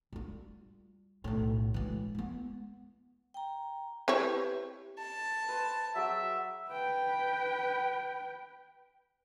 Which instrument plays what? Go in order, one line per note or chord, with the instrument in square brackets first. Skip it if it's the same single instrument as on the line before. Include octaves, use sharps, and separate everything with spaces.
[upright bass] G3 F4
B1 A2
E3 G#3
G#3 B3
[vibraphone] G5 A#5
[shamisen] C4 E4 C#5 [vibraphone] G4 B4
[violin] A5
[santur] B4 C5
[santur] F#3 G#4 G5 [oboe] E5
[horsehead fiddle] B4 G5